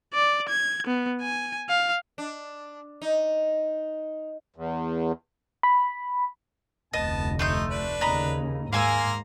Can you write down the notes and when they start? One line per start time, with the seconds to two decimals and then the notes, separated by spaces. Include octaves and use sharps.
0.14 D5
0.49 G#6
0.87 B3
1.22 G#5
1.69 F5
2.18 D4
3.02 D#4
4.56 E2
5.63 B5
6.94 F1 D2 B3 D#5 A5
7.39 A3 D#4 C6 G6
7.70 D4 B4
8.01 D#2 C#3 D#5 A#5 B5
8.73 G#2 A#3 F5 G#5 A#5 C6 E6